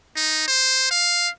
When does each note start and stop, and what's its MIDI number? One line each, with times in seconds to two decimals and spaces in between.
0.16 0.43 63
0.48 0.89 72
0.91 1.29 77